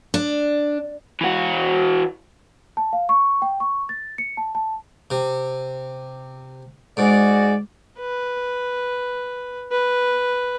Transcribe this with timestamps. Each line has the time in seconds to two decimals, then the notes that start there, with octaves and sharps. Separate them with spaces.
0.14 D4
1.21 E3 F#4
2.77 A5
2.93 F5
3.09 C#6
3.42 G5
3.60 C#6
3.89 A6
4.18 C#7
4.37 A5
4.55 A5
5.11 C3
6.97 G#2 F#4 G#4 D5
7.99 B4
9.71 B4